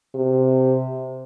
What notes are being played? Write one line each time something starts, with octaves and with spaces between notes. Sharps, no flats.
C3